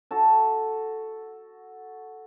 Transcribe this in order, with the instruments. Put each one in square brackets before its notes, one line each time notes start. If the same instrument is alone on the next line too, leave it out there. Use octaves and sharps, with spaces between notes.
[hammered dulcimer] F#4 A4 A5